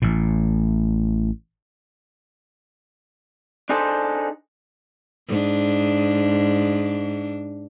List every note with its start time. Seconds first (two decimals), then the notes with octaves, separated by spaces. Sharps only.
0.02 A1 A2
3.69 D4 D#4 G#4 A4 C5
5.28 G#2 D4